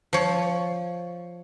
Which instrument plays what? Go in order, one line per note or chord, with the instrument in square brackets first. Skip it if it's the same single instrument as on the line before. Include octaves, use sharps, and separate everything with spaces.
[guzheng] F3 C#5